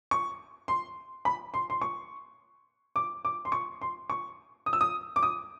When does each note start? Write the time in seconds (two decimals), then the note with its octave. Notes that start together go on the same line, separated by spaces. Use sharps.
0.11 C#6
0.68 C6
1.25 B5
1.54 C6
1.70 C6
1.82 C#6
2.96 D6
3.25 D6
3.45 C6
3.52 C#6
3.82 C6
4.10 C#6
4.66 D#6
4.73 E6
4.81 D#6
5.16 D6
5.23 D#6